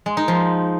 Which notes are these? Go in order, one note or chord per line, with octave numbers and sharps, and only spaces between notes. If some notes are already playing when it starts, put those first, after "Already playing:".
G#3
D#4
F3